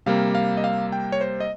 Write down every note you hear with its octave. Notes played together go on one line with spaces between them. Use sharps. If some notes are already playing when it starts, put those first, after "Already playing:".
C3 G3 A#3 F5
F5
D#5
F5
G5
C#5
C5
D#5